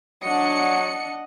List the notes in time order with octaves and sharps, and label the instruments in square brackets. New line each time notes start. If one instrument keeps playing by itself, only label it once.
[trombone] F#3 [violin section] D4 C#7 [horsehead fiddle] D#5 F#5